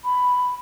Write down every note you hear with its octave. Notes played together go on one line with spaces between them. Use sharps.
B5